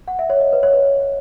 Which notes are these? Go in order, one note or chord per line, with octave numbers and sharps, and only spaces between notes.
F#5
E5
C#5
D#5
B4
C#5
B4